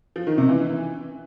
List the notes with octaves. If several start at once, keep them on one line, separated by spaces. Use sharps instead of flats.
F3
D#3
C3
E3